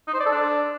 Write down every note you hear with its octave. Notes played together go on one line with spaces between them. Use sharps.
D#4
C5
D5
A4
D4